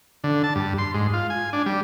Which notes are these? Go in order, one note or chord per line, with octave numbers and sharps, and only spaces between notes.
D3
A5
G2
C6
G#2
F4
G#5
D4
G3